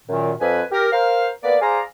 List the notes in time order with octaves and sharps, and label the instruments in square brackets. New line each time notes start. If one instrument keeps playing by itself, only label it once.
[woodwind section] F#2 A#2 D#3
F2 B4 G#5
G4 A#4
A#4 C5 F5
A#3 B3 B4 D5
G#4 C5 D5 F5 G#5 A#5